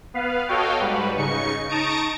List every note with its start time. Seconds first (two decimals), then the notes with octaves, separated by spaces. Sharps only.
0.14 B3 B4 F5
0.48 F#4 A4 C#5 D#5 F5 G5
0.80 G#2 G3 F#4 B4
1.17 C#3 D#4 C#6 C#7
1.69 D#4 A5 A#5 C#6 D#6 D7